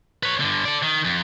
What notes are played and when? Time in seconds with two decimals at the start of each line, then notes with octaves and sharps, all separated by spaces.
0.23 B4 C#5
0.40 G2 D3
0.65 A4 D5
0.83 D#3
1.04 F2